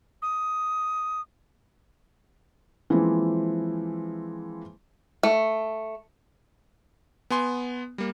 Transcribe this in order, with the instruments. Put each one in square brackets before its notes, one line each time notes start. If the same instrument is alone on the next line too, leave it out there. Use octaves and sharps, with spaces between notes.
[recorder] D#6
[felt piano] E3 F3 G#3 A#3 C4 E4
[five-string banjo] A3
[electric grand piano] B3 G#5 C6
G3 A#3